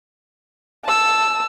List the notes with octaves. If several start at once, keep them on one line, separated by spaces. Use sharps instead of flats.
A5 E6